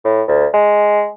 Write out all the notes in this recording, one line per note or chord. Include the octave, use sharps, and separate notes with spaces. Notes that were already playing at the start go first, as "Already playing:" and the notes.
A2
D2
G#3